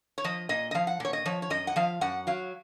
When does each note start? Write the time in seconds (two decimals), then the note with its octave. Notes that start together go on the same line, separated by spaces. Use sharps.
0.18 C#5
0.24 F3 D#5
0.49 A#2 D#5
0.71 D#5
0.74 F3 F5
0.87 F#5
1.00 A#2 C#5
1.13 D#5
1.25 F3 C#5
1.42 C#5
1.50 F#2 D#5
1.67 F#5
1.76 F3 F5
2.01 F#2 F#5
2.27 F#3 F5